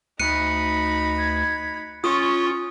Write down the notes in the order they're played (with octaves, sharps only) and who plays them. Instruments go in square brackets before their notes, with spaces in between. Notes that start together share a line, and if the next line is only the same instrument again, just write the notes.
[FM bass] D2 [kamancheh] D#4 B5 [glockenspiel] F#6 C#7 D#7
[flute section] G#6
[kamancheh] C#4 [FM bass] F4 [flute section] C#6 [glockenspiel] D#6